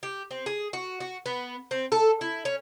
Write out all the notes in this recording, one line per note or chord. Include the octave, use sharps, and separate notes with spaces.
G4
C4
G#4
F#4
F#4
B3
C4
A4
E4
C#4